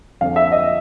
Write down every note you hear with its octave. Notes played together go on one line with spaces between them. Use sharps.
F2 D3 F3 F5
E5
D#5